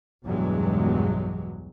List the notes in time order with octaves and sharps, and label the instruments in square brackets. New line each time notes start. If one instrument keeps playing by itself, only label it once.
[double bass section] B1 E2 G2 F#3 G#3